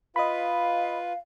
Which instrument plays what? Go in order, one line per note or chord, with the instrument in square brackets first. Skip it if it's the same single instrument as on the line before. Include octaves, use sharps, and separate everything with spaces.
[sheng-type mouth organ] F4 B4 [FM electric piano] D#5 B5 [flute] F5